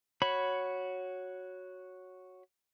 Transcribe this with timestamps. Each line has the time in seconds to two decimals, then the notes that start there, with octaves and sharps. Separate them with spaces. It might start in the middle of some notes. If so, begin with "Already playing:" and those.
0.22 F#4 C#5 B5